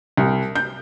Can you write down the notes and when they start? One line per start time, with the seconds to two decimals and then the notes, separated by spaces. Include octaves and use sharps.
0.17 C2
0.55 G6